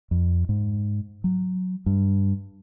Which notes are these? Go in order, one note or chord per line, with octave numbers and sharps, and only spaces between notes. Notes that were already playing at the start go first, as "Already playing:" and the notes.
F2
G#2
F#3
G2